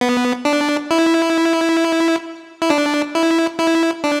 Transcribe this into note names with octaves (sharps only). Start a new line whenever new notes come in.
B3
D4
E4
E4
D4
E4
E4
D4